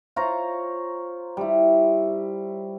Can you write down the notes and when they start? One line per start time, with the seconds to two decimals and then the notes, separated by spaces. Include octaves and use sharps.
0.16 F4 C5 C#5 A#5
1.37 G3 E4